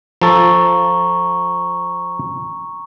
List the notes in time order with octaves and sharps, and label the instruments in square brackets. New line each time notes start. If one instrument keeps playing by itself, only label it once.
[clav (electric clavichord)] F3 A4 [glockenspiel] A#5 C#6